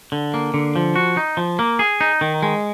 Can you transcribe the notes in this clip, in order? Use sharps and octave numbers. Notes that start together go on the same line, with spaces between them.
D3
A#3
D3
F3
F#4
D#4
F3
A#3
G#4
D#4
D#3
G#3